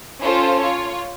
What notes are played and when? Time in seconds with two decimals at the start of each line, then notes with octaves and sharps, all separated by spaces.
0.21 C#4 F4 A4 C5
0.61 F4 C#5